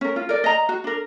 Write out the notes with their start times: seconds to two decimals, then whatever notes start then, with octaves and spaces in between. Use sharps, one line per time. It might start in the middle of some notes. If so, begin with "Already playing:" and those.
0.01 C#4 A#4
0.16 F4
0.29 A#4 D5
0.44 D#5 A#5
0.69 F#4
0.84 D4 A#4